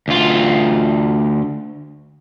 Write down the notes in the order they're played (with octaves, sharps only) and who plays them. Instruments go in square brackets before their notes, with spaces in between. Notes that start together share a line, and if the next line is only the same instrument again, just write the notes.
[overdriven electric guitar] D2 F4